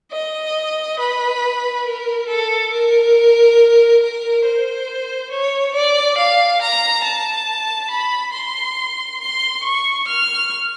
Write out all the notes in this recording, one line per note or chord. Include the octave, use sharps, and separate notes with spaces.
D#5
B4
A#4
A4
A#4
A#4
C5
C#5
D5
F5
A#5
A5
B5
C6
C6
C#6
F6